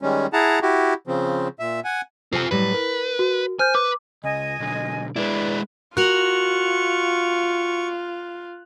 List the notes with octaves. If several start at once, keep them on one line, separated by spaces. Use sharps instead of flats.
D#3 G3 G#3 C#4
E4 G#4 F#5 A5 A#5
E4 F#4 G4
C#3 F3 C4
A#2 E5
F#5 G#5
C3 F4 A4 G#5
A2 F#3 G3 B4
A#4
F#4
C5 G#5 F6 G6
B4 D6
C#2 D#5 G#5
B1 D3
G#3 E4 B4 D5
F4 F#4 A#4 C#6 F#6 F7 F#7